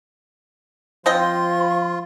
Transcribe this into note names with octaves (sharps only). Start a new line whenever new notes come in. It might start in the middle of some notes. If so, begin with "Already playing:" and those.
F3 C4 F4 D#5 G5 C6